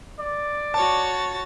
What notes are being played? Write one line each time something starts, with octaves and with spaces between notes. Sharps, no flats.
D5
F#4 C#5 A5 A6